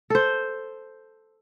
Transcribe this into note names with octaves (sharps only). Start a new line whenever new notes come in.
A4 C5